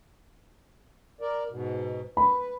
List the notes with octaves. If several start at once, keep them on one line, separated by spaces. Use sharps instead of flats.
A#4 D5
G#2 B2
B4 B5